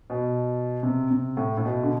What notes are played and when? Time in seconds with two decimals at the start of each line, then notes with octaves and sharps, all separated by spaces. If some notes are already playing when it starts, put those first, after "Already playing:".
0.10 B2
0.83 C3
1.11 C3
1.37 A2
1.57 A2
1.65 B2
1.83 D3